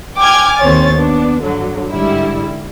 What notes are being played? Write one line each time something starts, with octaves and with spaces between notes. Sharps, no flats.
G5 G#5 D6 F6 G#6
D#2 C4 C#4 C5 C#5 A6
B3 D4
G2 D3 F#3
G#2 D3 G3 E4